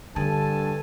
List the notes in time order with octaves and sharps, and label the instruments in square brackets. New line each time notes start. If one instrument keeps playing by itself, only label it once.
[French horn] G2 [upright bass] D3 [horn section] A4 G#5 A5